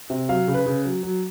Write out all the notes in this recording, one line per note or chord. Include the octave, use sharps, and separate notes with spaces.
C3
F#3 F5
C#3
B4
C#3
F#3
F#3